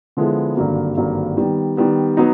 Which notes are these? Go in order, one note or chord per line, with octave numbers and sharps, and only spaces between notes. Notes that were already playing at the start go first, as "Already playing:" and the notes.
D3 F3 G#3 B3 E4
G#1 G2 D3 F#3 A#3
G#1 G2 D3 F#3 A#3
D#3 G3 B3
D#3 G3 B3
F#3 B3 D#4